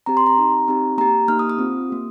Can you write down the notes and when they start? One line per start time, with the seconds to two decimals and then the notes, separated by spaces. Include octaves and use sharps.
0.06 C4 G4 A#5
0.17 C6
0.26 A#5
0.38 C4 D#4 G4
0.68 C4 D#4 G4
0.98 A#3 G4 A#5
1.28 A#3 D#4 G4 F6
1.39 D#6
1.50 D#6
1.58 C4 F4
1.89 A#3 G4